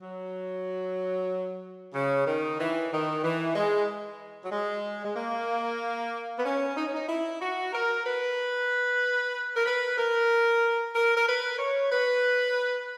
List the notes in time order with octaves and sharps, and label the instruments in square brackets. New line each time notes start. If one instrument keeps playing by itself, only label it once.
[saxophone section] F#3
C#3
D#3
E3
D#3
E3
G#3
F#3
G#3
G#3
A#3
B3
C#4
D#4
C#4
D#4
E4
F#4
A#4
B4
A#4
B4
A#4
A#4
A#4
B4
C#5
B4